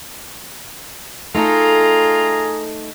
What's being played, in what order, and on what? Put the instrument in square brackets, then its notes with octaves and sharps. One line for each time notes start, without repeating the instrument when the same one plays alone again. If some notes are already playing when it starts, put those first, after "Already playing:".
[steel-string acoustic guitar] A3 D#4 A4 [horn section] F4 G#4 A#5